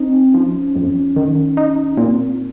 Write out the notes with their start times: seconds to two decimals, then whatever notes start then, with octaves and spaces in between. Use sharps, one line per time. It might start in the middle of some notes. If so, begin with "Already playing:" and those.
Already playing: C4 D#4
0.34 F3 C#4
0.75 F2
1.16 D#3
1.57 D#4
1.97 A#2 C4